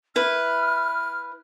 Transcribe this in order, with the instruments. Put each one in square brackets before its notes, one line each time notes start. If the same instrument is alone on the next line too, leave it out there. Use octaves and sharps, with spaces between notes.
[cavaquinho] E4 B4 [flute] F6